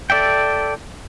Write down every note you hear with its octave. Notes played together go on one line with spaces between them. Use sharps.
A4 D5 E5 G5